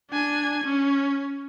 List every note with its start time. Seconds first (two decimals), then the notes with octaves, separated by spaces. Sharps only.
0.11 D4 G#5
0.64 C#4